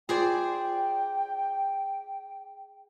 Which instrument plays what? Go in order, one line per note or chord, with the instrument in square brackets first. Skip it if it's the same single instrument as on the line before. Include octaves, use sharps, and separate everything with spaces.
[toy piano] F4 [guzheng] G#4 C5 D5 [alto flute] G5